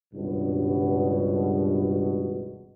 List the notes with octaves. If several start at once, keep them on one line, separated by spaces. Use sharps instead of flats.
G#1 C#2 G2 B2